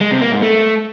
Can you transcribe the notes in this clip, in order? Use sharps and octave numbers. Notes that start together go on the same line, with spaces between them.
G#3
C3
A#3
G#2
A3